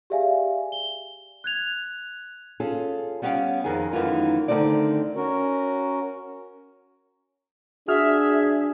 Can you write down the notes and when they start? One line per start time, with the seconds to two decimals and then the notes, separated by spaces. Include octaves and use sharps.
0.10 G4 G#4 D5 E5 F5 G#5
0.72 G7
1.44 F#6 G#6 F7
2.60 C#4 F4 G#4 A4
3.22 G3 B3 C#4 A#4 F5 G5
3.64 F2 D#3 G#4 G#5
3.93 F#2 D#3 E3 A3 D#4 F4
4.48 D3 D#3 A3 C4 D5
5.15 C#4 F#4 A#4
7.88 D4 F#4 G#4 E5 F6